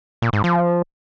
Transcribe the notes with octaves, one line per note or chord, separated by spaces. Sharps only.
A#2
G#2
F3